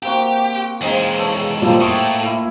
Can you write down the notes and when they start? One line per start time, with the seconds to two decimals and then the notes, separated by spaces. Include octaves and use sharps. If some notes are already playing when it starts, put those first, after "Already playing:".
0.03 A#3 C4 F#4 G4
0.81 E2 C#3 G#3 C4 D#4
1.19 A4 C#5
1.62 A#2 F3 G3 A#3 A4 C5
1.81 A2 A3 G5 C#6 D#6
2.21 A#2 E4